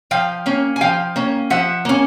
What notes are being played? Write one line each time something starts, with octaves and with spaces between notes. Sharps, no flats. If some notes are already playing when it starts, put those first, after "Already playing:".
F3 F5 G5
A#3 C#4
G#5
F3 F5 G5
A#3 C#4
F3 E5 F#5
A#3 C#4